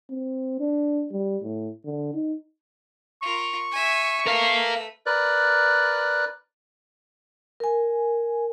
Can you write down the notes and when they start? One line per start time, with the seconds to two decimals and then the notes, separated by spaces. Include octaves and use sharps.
0.10 C4
0.60 D4
1.12 G3
1.43 A2
1.85 D3
2.14 D#4
3.22 F4 A#4 C#6
3.72 E5 G#5
4.26 A3 A#4 B4 F5
5.06 A#4 B4 D5 F#6
7.60 A#4 G#5